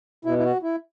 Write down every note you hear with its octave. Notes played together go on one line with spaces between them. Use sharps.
B2 E4
E4
F#4
E4